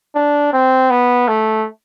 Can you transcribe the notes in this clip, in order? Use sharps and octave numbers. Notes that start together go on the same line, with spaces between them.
D4
C4
B3
A3